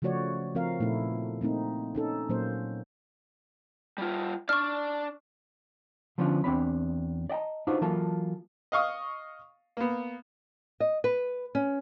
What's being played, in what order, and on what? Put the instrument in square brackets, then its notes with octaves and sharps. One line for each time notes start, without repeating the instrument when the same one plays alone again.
[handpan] C#3 F3 A3 F#4 C#5 D5
F3 C4 A#4 F5
A#2 A3 B3 D#4 E4
A3 A#3 C4 D#4
C#4 D#4 A4
A#2 F#3 A#3 C#4 C5
[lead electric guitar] G3 F4
[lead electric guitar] D4 D5 [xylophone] C#6 F6
[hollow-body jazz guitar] D3 F3 B3 C#4 D4 F4
E2 C4 D4 C#5 B5
D5 D#5 G5 A5 A#5
D4 D#4 F4 F#4 B4 C5
E3 F#3 A#3 F4 A4 A5
[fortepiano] D#5 F5 C#6 D#6
A#3 B3
[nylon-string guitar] D#5
B4
C#4